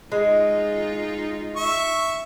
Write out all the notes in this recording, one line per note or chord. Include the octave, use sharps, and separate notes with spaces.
G#3 D#4 F4
E5 C#6